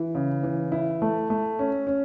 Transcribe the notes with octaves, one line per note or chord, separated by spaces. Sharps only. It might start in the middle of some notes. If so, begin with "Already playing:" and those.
Already playing: E3 E4
C#3
E3
E4
A3
A3
C#4
C#4